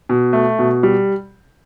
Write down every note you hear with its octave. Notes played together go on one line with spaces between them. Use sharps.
B2
A3
B2
G3